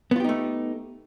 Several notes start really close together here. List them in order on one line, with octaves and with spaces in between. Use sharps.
B3 F4 G4 D#4 A3